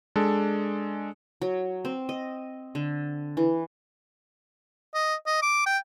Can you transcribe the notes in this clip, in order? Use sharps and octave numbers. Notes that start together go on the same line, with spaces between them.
G#3 D4 A4
F#3
C4
D#5
D3
E3
D#5
D#5
D6
G5